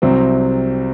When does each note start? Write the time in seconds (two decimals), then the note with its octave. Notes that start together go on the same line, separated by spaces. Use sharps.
0.02 C2 C3 F#3 C4